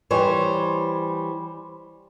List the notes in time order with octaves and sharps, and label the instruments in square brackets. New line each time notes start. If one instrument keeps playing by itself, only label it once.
[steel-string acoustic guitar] E3 G3 C5 C#5